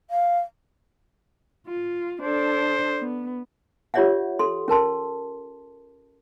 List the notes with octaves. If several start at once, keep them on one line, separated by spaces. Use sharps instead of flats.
F5
F4
D4 A4 C5
B3
F4 G4 C#5 D5 E5 F#5
A4 C6
C#4 A#4 A5 C6